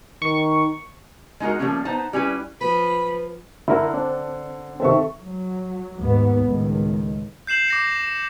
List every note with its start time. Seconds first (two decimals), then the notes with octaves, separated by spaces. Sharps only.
0.22 D#3 C#6
1.40 G#3 D#4 F#4 A#4
1.59 F3 G3 A3 A#3 C#4
1.85 B3 D#4 C5 A5
2.13 G3 C#4 E4 B4
2.61 F3 B4 B5
3.68 D3 E4 A#4
3.94 C4 D4
4.80 C3 D#3 C4 A4 E5 C#6
5.18 F#3
6.00 D#2 G#2 B3
6.43 C#2 A2 D#3
7.47 G6 C7 E7 F#7
7.68 D6 A#6 C#7